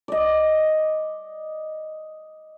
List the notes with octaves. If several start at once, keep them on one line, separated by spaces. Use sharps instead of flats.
D5 D#5